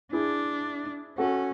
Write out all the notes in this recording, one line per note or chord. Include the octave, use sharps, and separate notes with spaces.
D4 E4 G#4
C#4 F#4 A4